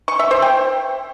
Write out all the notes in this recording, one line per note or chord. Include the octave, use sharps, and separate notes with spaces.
C#6
E5
C5
G5